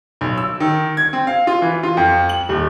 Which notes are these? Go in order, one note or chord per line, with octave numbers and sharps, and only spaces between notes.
B1
E6
D#3
G#6
C4
F5
F4
E3
F4
F2
F#7
D#1